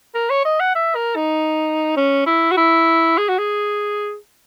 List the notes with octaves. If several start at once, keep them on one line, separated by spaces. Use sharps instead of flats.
A#4
C#5
D#5
F#5
E5
A#4
D#4
C#4
E4
F#4
E4
G#4
F#4
G#4